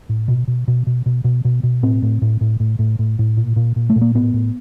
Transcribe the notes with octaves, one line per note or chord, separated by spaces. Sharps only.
A2
B2
B2
B2
B2
B2
B2
B2
B2
A2 C4
A2
A2
A2
A2
A2
A2
A2
A#2
A#2
A#2
A3
A#2
A#3
A2 B3
A2